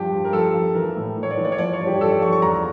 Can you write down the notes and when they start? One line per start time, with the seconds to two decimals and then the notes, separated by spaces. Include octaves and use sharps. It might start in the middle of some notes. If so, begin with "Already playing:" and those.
Already playing: G2 F3 G4
0.12 F3
0.25 A#4
0.33 F3 A4
0.54 F3
0.75 E3 A#4
0.96 A2
1.17 A2
1.23 C#5
1.31 D5
1.37 E3
1.45 D5
1.52 C#5
1.58 F3 D5
1.73 C#5
1.80 G2
1.87 G4
2.01 F3 A4
2.12 D5
2.22 F3 C#6
2.32 C#6
2.42 E2 A#5